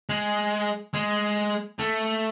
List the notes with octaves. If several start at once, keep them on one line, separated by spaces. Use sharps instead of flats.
G#3
G#3
A3